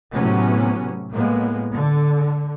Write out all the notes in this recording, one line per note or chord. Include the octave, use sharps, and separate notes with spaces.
A2 C3 F#3 B3 C#4
A2 G#3 A#3 B3
D3